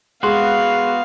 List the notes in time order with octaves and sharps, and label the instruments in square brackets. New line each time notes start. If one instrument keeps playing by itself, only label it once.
[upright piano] G#3 C6 [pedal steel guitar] B3 F#4 [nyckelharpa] F5